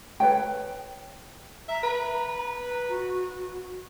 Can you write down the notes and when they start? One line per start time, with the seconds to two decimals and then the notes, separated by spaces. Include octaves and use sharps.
0.20 A4 B4 C#5 G5
1.69 E5 A#5
1.84 B4
2.68 A#5
2.89 F#4